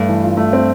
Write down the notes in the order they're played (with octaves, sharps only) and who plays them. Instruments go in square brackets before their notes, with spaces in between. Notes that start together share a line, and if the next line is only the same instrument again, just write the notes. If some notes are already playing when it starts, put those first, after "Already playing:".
Already playing: [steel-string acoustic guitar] G2 [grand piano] A3
[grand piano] E3
F4
A3
C4